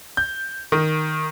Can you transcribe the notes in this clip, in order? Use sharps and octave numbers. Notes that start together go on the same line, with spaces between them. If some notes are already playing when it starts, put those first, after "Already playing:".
G6
D#3